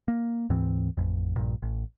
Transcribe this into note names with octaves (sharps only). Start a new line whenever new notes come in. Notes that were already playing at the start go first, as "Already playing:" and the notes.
A#3
D2 G#2 E3 C4
A1 F2
A#1 G2 A#2
A1